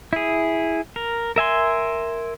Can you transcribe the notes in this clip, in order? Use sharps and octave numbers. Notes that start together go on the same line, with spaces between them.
E4 G#4
A#4
A#4 E5 G#5 C6